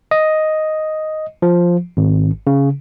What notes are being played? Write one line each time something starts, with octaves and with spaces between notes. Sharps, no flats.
D#5
F3
G#1
C#3